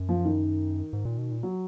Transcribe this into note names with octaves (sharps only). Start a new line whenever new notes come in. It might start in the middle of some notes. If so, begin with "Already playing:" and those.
Already playing: F#2
F3
D#3
G#2
A#2
B2
A#2
F#3